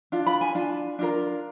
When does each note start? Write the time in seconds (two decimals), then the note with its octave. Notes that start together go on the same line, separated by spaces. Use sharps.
0.12 D4 F4
0.27 B5
0.41 G#5
0.55 D4 F4
0.99 D4 F4 A#4